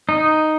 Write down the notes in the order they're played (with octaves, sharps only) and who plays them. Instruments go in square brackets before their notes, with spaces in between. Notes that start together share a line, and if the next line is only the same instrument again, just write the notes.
[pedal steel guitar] D#4